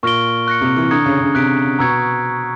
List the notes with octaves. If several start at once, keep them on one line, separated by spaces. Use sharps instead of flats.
A#2 C#6 F6 A#6 D7 G7
C#6 F#6 A#6 C#7
C3
E3
D3 A#5 D#6 G#6 C#7
C#3
C#3
C3 F#6 B6 D7
B2 A#5 C#6 E6 G#6 C#7